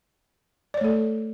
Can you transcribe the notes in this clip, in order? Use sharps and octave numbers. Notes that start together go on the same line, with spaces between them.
A3 A4 C#5 D5